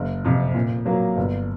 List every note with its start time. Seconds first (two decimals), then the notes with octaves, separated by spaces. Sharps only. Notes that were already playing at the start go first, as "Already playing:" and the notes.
Already playing: F#1
0.25 F2 C3
0.54 A#2
0.86 F#3 A#3
1.17 G1